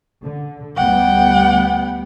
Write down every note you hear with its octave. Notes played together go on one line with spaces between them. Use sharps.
D3
D2 G3 B3 F#5 G5